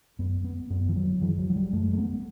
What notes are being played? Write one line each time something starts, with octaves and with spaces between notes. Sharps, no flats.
F#2 B3
B3
F#2 B3
E3
F#3
F#2 E3
F#3
F#3
G3
F#2 A3
A3
B3